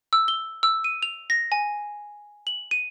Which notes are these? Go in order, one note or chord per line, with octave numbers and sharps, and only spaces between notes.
E6
G7
E6
D#7
F7
A#6
G#5
F#7
D#7